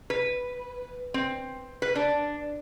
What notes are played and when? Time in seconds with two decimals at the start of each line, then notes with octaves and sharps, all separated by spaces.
0.10 B4
1.14 C4
1.82 B4
1.95 D4